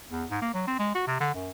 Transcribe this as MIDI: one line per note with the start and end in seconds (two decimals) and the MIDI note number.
0.11 0.25 40
0.30 0.41 44
0.41 0.51 58
0.54 0.63 54
0.67 0.75 60
0.79 0.90 56
0.95 1.04 66
1.07 1.16 48
1.20 1.34 50
1.35 1.51 42